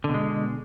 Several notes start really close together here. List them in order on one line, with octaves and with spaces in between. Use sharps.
D3 B2 G#3